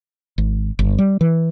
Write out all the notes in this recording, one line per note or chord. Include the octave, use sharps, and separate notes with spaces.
G#1
G1
G3
E3